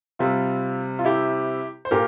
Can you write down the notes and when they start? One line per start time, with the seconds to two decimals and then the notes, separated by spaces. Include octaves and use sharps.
0.19 C3 G3 C4 F4
0.99 F4
1.05 E4 G4
1.85 C5
1.91 A#2 G4 A#4